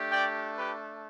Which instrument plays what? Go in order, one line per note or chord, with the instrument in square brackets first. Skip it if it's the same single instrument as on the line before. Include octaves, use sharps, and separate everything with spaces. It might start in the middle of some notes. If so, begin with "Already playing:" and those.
Already playing: [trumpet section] A3 D4 G4
D5 G5
G4 B4